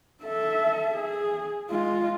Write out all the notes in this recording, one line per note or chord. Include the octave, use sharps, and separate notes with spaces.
A4 E5
G#4
G#3 F4